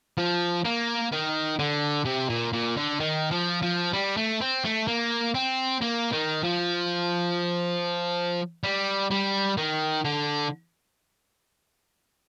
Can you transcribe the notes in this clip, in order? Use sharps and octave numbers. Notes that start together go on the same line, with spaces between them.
F3
A#3
D#3
D3
C3
A#2
A#2
D3
D#3
F3
F3
G3
A3
C4
A3
A#3
C4
A#3
D#3
F3
G3
G3
D#3
D3